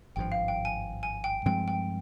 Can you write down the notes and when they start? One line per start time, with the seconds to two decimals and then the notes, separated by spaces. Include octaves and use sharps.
0.16 G#1 G2 F3 G5
0.32 F5
0.48 G5
0.65 G#5
1.03 G#5
1.24 G5
1.45 G2 F3 G#3 C4 G5
1.68 G5